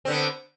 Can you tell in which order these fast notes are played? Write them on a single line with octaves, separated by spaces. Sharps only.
C4 D3 B3